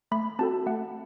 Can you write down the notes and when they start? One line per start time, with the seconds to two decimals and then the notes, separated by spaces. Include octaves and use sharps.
0.12 A3 B5
0.39 C4 F#4 A4 A5
0.66 A3 F#5